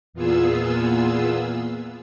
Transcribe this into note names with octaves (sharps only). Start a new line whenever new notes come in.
E2 A#2 B3 F4 G#4 E6